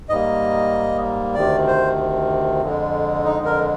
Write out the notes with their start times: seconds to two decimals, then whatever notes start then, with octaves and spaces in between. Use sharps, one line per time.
0.09 G#2 G3 A#3 D#5
1.35 D2 C3 D#3 D5
1.67 C5
2.62 F2 D3 G#3
3.24 D#4
3.45 A#4